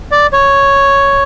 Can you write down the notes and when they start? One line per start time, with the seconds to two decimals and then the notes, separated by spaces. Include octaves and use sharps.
0.12 D5
0.33 C#5